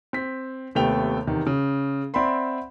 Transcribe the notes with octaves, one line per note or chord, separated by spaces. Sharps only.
C4 B6
D#2 C3 A3 B3 G5 F7
E2 C3 D#3
C#3
C4 D5 E5 F#5 B5 C6